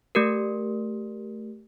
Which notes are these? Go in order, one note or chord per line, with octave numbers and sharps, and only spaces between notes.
A3 G4 A#4